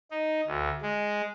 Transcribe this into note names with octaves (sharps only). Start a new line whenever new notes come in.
D#4
D2
G#3